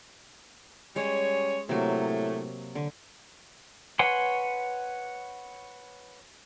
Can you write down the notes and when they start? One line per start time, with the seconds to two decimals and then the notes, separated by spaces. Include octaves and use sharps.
0.96 G3 G#3 C#4 C#5
1.69 A2 C3 F#3 A3 A#3
2.75 D3
3.99 B4 C#5 F#5 G#5 C6